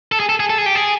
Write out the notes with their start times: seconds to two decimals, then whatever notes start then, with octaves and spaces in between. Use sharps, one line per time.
0.12 A4
0.20 G#4
0.29 A4
0.40 G#4
0.50 A4
0.58 G#4
0.66 G4
0.75 G#4